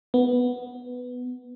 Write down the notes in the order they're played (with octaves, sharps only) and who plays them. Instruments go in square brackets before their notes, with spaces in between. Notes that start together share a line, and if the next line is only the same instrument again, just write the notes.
[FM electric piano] B3